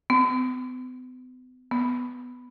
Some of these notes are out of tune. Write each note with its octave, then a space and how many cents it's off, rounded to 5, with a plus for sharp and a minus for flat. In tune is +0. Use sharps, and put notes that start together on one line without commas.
B3 +45
B3 +5